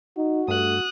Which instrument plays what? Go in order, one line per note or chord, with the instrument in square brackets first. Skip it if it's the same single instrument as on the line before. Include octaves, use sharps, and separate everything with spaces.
[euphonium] D#4 [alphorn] F#4
[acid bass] G2 [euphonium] A3 [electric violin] D#6 F#6